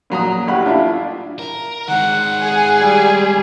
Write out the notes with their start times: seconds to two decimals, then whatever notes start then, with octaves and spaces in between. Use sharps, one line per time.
0.10 A#2 F#3 A#5 D#6
0.47 A1 G4 F#5 B5
0.66 D4 E4 F4
1.39 A#4
1.88 D#3 G#3 F#5
2.41 G#4
2.80 G3